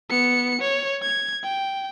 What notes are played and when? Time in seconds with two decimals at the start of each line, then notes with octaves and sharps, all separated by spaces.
0.10 B3 C#7
0.61 C#5
1.02 G#6
1.44 G5